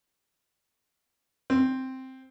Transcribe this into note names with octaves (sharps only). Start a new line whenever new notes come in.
C4